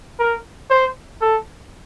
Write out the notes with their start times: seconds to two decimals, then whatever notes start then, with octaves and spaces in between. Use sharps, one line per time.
0.19 A#4
0.70 C5
1.21 A4